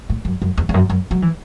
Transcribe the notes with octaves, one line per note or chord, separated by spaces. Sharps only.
A2
F#2
F#2
E2
E2
F#2
F#2
F#3
E3